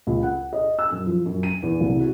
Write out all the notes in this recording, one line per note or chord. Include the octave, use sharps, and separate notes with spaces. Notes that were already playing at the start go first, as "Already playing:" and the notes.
C#2
F#5
D#5
E6
F#2
F3
F#2
D#7
E2
C2
F#4